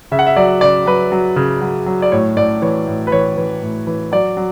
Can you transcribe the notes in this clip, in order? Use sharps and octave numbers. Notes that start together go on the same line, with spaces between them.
C#3 E5
F#5
E5
F#3 D5
C#3 D5
F#3 B4
F#3
C#3
F#3
F#3
D5
A2 C#5
A2 D5
E3 C#5
A2
B4
E3 C#5
E3
A2
E3
F#3 D5
F#3